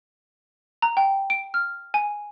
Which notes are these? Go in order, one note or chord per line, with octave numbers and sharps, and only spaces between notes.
A#5
G5
D7
F6
G#5